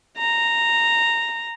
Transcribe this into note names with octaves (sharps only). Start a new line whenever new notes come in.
A#5